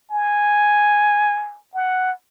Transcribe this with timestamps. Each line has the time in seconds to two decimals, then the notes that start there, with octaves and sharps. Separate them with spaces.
0.10 G#5
1.74 F#5